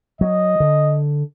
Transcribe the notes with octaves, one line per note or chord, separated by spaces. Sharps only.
F#3 D#5
D3